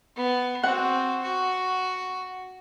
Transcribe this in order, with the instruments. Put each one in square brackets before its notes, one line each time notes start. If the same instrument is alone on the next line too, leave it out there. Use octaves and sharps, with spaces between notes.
[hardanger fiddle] B3
[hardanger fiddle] C4 F#4 [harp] F#5
[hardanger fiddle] F#4